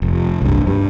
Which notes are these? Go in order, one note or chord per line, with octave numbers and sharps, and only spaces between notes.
F1
C2 G2
G2